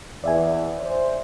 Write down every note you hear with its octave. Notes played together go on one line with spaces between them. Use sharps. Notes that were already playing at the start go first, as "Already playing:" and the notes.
E2 D5 E5 G#5
C5